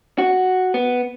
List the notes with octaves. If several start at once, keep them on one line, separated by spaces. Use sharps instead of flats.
F#4
B3